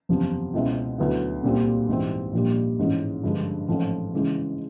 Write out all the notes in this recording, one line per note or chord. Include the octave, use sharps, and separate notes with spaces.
F#1 E2 C3 F3
C#2 B2 G#3 C4 E4
D2 D3 F#3 B3 E4
C2 A#2 G3 C4 F4
G#2 E3 G3 C4
A#1 A#2 G3
A1 G#2 E3 G#3 C#4
G2 D3 F3 G#3
A1 G#2 F3 A3 C4
C#3 E3 G#3